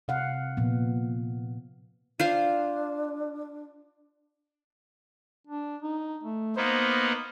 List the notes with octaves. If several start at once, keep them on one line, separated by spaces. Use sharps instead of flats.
C3 F5 F#5
A#2 F3 B3
D4 F4 C5 F5
D4
D#4
A3
A#3 B3 D#4 C5